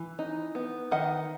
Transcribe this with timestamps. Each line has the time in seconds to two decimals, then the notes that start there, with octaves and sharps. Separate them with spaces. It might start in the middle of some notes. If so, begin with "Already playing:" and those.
Already playing: E3
0.19 D#4
0.55 B3
0.91 D#3 D#5 F#5